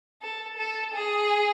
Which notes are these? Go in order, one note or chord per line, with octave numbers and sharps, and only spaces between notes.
A4
A4
G#4